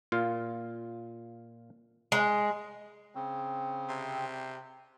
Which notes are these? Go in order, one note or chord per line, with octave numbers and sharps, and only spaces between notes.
A#2 F4 F5
G#3
C#3 C4
C3